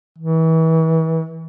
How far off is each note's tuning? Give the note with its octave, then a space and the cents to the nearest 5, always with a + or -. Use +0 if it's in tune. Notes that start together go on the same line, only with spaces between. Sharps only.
E3 -35